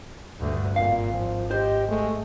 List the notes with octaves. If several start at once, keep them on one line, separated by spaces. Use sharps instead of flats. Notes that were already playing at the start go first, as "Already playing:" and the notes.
D2 G2
G#1 A#2 F5
F3
G4 C5 D#5
G#3 A3